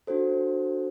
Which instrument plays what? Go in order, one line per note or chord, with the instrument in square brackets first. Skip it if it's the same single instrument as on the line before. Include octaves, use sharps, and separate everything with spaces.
[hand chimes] D4 F#4 A4 C5